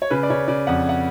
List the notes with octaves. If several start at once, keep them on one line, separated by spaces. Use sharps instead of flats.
C#5
C#3 B4
D5
C#3 C#5
C#3 D5
F2 F#5
F#5